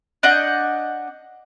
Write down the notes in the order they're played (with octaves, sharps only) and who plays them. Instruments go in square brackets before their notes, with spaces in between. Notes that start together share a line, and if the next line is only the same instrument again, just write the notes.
[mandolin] D4 D#5 F#5 G6